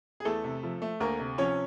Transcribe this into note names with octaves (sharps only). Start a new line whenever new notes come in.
G#4
E2 A3 A4
C3
F3
A3
D2 A#3 A#4
C3
F3 C#4 C#5